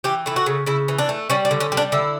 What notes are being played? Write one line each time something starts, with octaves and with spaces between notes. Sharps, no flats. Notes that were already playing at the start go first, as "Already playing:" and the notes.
E3 G4
A3 E4
F#4
C#3
C#3 E4
E3
D4
A3
G3 C#4
D4
D3
C#4
G3
D4
D3 E4